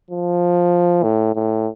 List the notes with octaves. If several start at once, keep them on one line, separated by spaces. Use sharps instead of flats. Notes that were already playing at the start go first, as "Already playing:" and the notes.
F3
A2
A2